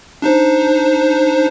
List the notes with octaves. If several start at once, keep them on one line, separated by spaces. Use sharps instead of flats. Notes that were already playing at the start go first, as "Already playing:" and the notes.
D4 D#4 C5